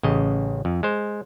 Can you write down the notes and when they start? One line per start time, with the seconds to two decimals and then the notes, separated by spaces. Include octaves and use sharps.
0.03 A1 C#3 D#5
0.65 F2
0.83 G#3 C5